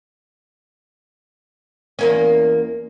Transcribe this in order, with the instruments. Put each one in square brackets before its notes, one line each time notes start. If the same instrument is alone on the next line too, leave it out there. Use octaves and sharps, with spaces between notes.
[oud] E2 A#3 C#4